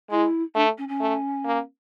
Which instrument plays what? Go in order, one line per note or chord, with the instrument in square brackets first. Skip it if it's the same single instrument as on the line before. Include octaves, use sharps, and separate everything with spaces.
[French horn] G#3 [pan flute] E4
[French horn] A3 [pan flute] D4
[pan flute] C#4
C#4
[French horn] A3
A#3